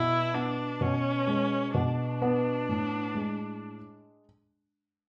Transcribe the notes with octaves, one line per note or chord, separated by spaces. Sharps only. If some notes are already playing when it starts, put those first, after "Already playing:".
Already playing: B2 E4
B3 D4
B2 C#4
G#3
B2 D4
B3
A2
G#3